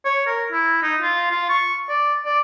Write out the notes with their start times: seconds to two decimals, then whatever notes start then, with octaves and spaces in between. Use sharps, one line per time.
0.05 C#5
0.27 A#4
0.52 E4
0.83 D#4
1.02 F4
1.31 F4
1.49 C#6
1.89 D5
2.25 D5